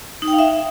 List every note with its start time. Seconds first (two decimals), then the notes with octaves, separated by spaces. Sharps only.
0.22 D#4
0.28 G5
0.33 F5
0.39 E5